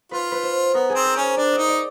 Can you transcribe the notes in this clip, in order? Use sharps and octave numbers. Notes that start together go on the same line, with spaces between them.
F4 B4
B4
C5
B3 A#4
G#4
C4
A#4
C#4 C5
D4 D5
D#5
D#4
D5